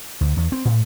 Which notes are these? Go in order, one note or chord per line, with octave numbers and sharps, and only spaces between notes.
D2
E2
C4
A2